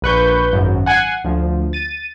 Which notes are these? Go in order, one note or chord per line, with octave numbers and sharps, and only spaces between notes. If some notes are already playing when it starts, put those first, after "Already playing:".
A#1 B4 C#6 G6
G#1 F#2
F#5 G#5 F#6 G#6 C7
D2 F3
A6 D#7